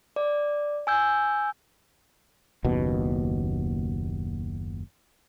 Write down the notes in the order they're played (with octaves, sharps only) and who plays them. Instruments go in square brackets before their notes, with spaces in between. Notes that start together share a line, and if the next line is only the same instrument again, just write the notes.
[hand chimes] D5
G#5 E6 G6
[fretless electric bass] F#1 D#2 B2